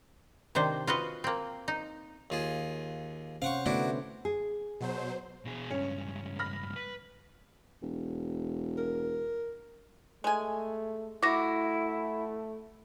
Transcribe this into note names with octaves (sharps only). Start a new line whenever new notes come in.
C3 D#3 D4 C5
F4 F#4 B4 D#5
A#3 C4
D#4
D#2 F4 G#4
C3 C#4 C5 F5 F#5 C#6
D3 A3 B3 D4 E4 F#4
G#4
B2 F#3 C5
B2 G#4
C#2 G2 C#4
B5 F6 A#6
B4
E1
A#4
G#3 A3 G#5
A3 E4 F#4 D6 A#6